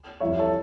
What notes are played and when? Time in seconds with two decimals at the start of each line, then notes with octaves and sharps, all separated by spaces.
0.20 F2 E3 G3 C#5 E5
0.39 A4 C#5